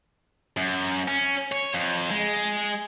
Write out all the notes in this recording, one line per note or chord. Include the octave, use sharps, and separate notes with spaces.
F#2
C#4
C#5
F2
G#3